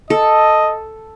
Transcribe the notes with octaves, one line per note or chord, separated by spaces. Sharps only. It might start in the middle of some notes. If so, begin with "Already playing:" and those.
A4 D#5